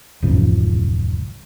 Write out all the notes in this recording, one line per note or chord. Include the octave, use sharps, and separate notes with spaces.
E1 C#2 G#2 F3